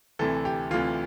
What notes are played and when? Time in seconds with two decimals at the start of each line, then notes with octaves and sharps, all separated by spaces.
0.19 D2 C3 E3 A4
0.45 G4
0.71 D2 C3 E3 F4